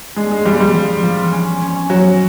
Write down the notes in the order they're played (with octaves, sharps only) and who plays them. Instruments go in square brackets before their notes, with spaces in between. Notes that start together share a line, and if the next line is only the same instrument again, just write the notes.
[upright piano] G#3 [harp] D4
[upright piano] G#3
[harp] F3 [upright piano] G3
[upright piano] G3
[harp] F3
F3
C#4
C#4
[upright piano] F#3 [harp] C#4